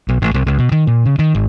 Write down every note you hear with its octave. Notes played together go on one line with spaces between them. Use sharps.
B1
A1
C2
C#2
B2
D#3
A#2
C#3
D#3
G#1